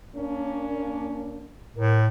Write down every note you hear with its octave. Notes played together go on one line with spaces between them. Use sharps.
A#3 C#4 D4
A2 A#4